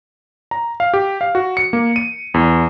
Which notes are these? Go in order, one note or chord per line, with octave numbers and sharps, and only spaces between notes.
A#5
F5
G4
F5
F#4
C#7
A#3
D#7
E2